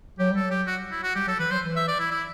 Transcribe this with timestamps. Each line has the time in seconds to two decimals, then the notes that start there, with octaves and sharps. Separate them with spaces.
0.19 F#3 G4
0.31 G3 A4
0.42 F#3
0.50 G4
0.67 F#4
0.91 E4
1.03 F#4
1.15 G3 G4
1.27 F#3 A4
1.39 E3 B4
1.51 F#3 C5
1.63 E3
1.76 E5
1.88 D5
1.99 E4
2.11 E4